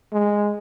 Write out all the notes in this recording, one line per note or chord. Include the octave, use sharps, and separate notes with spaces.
G#3